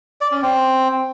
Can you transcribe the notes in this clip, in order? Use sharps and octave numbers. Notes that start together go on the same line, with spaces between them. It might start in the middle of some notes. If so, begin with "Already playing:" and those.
D5
C#4
C4